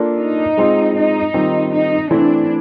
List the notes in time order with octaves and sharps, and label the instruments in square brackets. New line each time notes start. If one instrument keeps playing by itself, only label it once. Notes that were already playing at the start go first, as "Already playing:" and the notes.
Already playing: [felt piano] A#3 D4 F4 A4
[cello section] D#4
[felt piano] G#3 C4 F4
[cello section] D#4
[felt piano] D#3 G3 C4 F4
[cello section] D#4
[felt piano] E3 A3 C4 E4 [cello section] D4